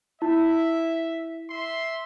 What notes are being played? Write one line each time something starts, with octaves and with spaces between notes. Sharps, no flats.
E4 E5
E5 C6